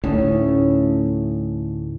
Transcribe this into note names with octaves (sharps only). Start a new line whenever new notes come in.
D2 A2 C#4 D#4 A4